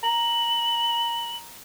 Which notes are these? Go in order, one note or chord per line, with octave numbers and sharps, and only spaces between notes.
A#5 F#7